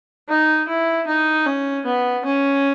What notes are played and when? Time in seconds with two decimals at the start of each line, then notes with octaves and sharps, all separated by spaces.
0.29 D#4
0.68 E4
1.07 D#4
1.46 C#4
1.86 B3
2.25 C#4